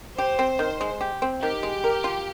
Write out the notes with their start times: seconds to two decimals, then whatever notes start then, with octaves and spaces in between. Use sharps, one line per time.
0.18 G4 C5
0.39 C4
0.59 D#3
0.81 G#3
1.01 G4
1.22 C4
1.42 D#3 G4
1.63 G#3
1.84 A#4
2.04 F4